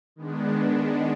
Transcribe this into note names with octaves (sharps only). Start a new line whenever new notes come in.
D#3 G#3 B3 D4